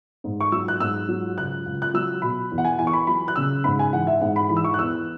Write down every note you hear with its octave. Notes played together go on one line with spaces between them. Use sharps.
G#2
C#6
F#3 E6
F#6
G#2 E6
F#3
C#2 F#6
C#2
F#6
F#3 E6
B2 B5
E2
F#5
G#5
E2 G#5
C#6
B5
F#3 B5
F#6
C#3 E6
G#2 B5
G#5
E3 F#5
E5
G#2 F#5
B5
E3 B5
E6
C#6
F#6
E2 E6